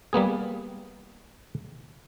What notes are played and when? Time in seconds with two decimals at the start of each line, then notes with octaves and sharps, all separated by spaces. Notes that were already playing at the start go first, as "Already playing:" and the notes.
0.13 G3 A#3 B3 G#4